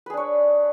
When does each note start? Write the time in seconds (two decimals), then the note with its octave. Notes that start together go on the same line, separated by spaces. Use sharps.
0.06 B4
0.10 G#4
0.14 D4
0.17 C#5